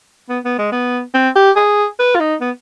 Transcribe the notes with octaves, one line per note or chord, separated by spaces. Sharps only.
B3
B3
G#3
B3
C4
G4
G#4
B4
F4
D#4
B3